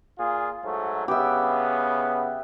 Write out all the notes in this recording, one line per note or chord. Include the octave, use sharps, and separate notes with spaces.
A#2 F4 G#4
G#2 F#3 A3
C#3 B3 G4 E5